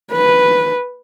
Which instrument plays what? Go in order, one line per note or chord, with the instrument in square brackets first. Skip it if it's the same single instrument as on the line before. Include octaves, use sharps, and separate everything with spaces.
[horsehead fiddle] B4